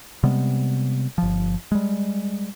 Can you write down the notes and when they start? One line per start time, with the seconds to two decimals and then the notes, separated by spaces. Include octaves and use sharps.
0.23 C3 G3 G#3 B3
1.18 G1 F3
1.72 G3 G#3